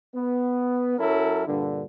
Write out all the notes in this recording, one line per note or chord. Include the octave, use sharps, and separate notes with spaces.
B3
F#2 F#3 C#4 E4 A4 A#4
G2 A#2 D3